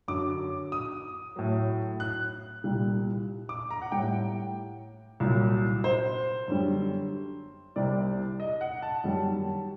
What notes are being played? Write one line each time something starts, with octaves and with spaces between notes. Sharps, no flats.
F#2 D3 F#3 D6
D#6
A2 F#3
F#6
C2 A#2 G3
D6
A#5
F#5
A2 G3 G5
C2 A#2 F#3
C5
F#2 D3 G3
C2 C3 G3 D5
D#5
F#5
A5
F#2 D#3 G3